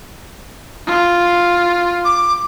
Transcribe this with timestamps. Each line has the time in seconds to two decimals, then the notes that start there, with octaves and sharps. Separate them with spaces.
0.87 F4
2.05 D6